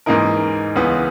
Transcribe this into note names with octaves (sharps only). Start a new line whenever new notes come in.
G#2 E3 A#3 D#4 A#4
C#2 C#3 E3 B3